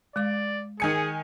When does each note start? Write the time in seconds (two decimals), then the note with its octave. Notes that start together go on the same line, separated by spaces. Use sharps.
0.16 G#3 D5 F5 D6
0.80 D#3 G#4 G#5 C#7